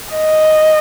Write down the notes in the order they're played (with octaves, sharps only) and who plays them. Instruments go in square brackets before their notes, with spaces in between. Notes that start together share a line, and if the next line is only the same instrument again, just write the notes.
[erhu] D#5